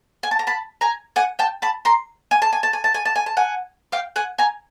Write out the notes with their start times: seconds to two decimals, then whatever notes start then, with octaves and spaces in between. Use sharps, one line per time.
0.23 G#5
0.31 A5
0.39 A#5
0.47 A5 B5
0.81 G#5 A#5
1.16 F#5 G#5
1.39 G5 A5
1.62 A5 B5
1.85 A#5 C6
2.31 G#5
2.42 A5
2.52 G#5
2.63 A5
2.73 G#5
2.84 A5
2.94 G#5
3.05 A5
3.16 G#5
3.26 A5
3.37 F#5 G#5
3.92 F5 G5
4.16 F#5 G#5
4.38 G#5 A#5